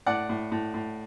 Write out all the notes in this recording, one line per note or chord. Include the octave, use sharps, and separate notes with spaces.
A2 D5 F#5
A2
A2
A2